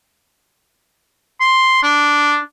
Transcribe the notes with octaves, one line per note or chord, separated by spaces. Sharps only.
C6
D4